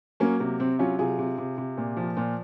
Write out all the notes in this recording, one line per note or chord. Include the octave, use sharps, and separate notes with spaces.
F#3 A#3 C#4
C3 A#3
C3 C4
F#3 C#4 F4
C3 F4 G#4
C3
C3
C3
A#2
F3
A#2